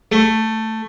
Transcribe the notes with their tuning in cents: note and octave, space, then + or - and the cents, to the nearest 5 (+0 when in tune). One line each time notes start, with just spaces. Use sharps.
A3 +10